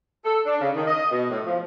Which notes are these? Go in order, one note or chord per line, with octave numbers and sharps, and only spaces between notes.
A4
D4
C#3
D#3
D#5
B2
A2
F3